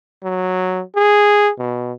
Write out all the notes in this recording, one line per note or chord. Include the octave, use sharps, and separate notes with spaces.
F#3
G#4
B2